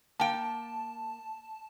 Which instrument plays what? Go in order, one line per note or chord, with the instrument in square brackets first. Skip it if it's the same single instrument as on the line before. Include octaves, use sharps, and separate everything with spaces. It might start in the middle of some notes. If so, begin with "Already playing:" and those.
[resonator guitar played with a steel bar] A#3 G5 [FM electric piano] A5